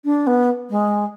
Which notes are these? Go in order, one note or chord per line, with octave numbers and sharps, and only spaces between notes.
D4
B3
G#3